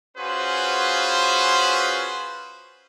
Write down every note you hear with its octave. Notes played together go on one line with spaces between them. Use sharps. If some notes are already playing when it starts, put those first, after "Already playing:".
C#4 F4 F#4 G#4 B4 C5